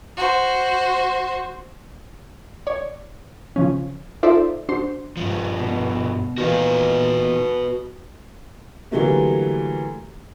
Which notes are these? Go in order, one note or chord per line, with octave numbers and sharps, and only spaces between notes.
F#4 C5
C#5 D5
C#3 F3 C#4
D#4 F4 A4 C5 D5 E5
D4 F#4 C5 C6
G2 F3
B2
E2 A#2 D#3 F#4 B4 F5
D3 E3 F#3 G3 A3 A#3